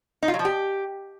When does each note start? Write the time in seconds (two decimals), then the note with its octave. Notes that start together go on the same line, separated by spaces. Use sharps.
0.23 D#4
0.28 F4
0.34 F#3
0.39 F3
0.45 G4